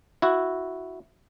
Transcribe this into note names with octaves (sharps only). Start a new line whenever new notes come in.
E4 F#4